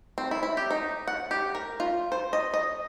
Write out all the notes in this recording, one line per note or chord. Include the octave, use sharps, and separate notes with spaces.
C4
E4
E4
G4
D#4
F#5
G4
A#4
F4
C5
D#5
D#5